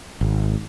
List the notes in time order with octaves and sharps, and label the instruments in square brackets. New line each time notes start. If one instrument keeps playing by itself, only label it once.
[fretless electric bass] G#1